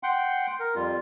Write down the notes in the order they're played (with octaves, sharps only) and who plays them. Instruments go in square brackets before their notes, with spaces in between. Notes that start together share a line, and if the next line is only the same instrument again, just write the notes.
[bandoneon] F#5 G5 C6
A#4
F2 G3 F4